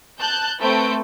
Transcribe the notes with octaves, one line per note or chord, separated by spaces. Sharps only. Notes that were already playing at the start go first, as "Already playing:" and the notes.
A5 F#6 G6
A3 C4 A4 B4 G6 D7